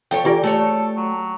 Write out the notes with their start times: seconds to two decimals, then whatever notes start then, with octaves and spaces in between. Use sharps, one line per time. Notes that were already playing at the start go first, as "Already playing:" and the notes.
0.11 F3 A4 C#5 G5
0.25 E3 F4 G4 D5
0.43 A3 G#4 A4 C#5
0.97 F#3